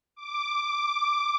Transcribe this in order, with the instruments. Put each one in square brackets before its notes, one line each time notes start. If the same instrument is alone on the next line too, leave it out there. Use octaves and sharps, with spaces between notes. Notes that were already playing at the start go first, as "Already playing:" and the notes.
[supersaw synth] D6